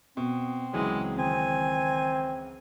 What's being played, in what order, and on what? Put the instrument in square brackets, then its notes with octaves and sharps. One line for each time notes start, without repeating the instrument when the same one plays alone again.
[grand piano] B2 [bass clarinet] C4
[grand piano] C#2 E3 F#3 [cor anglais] G#3
[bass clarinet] D#3 [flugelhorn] C4 [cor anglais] G#5